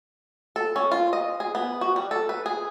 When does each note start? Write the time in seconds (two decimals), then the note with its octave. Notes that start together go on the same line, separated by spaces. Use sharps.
0.56 A4
0.76 C#4
0.91 F4
1.13 D#5
1.40 G#4
1.55 B3
1.81 F#4
1.96 G3
2.11 A4
2.29 B4
2.46 G#4